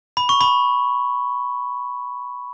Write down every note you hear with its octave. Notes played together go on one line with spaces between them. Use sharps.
B5
C#6
B5